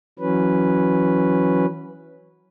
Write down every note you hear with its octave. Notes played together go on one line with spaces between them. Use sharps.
E3 F#3 C#4 B4